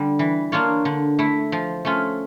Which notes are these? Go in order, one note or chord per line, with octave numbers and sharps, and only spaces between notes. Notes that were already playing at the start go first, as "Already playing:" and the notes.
Already playing: D3 G3
E3
A#3 D4 F4 C#5
D3
A3 E4
F3
A3 C#4 F4